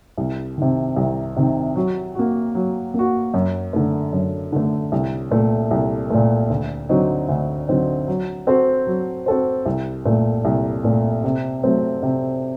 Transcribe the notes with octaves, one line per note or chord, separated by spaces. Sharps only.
C2
C3 D#3
C2
C3 D#3
F#3
A#3 F#4
F#3
A#3 F#4
F#2
D3 A3
F#2
D3 A3
C2
A#2 A3
C2
A#2 A3
D2
D3 F#3 C4 D#4
D2
D3 F#3 C4 D#4
F#3
C4 F#4 A4 C5
F#3
C4 F#4 A4 C5
C2
A#2 A3
C2
A#2 A3
C3
F#3 A3 C4
C3